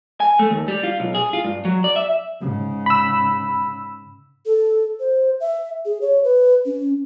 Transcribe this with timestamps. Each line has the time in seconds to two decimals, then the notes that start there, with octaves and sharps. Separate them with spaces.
0.20 G#5
0.39 A3
0.50 D#2
0.68 G3
0.84 F4
1.00 B1
1.14 G#4
1.33 F4
1.45 G2
1.65 F#3
1.84 D5
1.96 E5
2.41 G#2 C#3
2.86 B5 E6
4.46 A4
5.00 C5
5.41 E5
5.85 G#4
6.01 C#5
6.24 B4
6.65 C#4